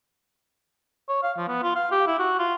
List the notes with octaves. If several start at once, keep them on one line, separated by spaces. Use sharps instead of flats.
C#5
F5
F3
B3
F4
F5
G4
E4
F#4
F4